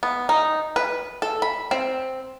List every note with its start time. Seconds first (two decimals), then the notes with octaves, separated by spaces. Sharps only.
0.03 B3
0.29 D#4
0.76 B4
1.22 A4
1.42 B5
1.71 C4